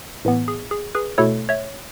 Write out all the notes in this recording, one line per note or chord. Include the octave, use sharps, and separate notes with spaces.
A2 E3 B3
G#4
G#4
G#4 B4
B2 A3 E4 A4 C#5
C#5 E5